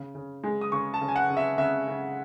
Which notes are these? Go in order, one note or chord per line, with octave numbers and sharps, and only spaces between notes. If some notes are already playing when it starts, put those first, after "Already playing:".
Already playing: C#3
C#3
G#3
D#6
C#3 C#6
A5
C#3
G#5
F#5
C#3
E5
C#3 E5
C#3